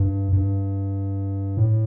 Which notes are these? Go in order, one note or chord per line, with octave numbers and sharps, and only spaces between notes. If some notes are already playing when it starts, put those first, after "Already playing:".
Already playing: G2
G2
A2